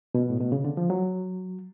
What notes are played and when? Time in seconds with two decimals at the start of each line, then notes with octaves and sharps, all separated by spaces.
0.15 B2
0.30 A2
0.40 B2
0.52 C#3
0.65 D3
0.77 F3
0.90 F#3